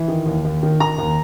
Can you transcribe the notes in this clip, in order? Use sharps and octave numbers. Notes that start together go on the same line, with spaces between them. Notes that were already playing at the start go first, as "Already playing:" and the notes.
Already playing: E3
D#3
D#2
D#2
D#3
D#3 A#5
D#2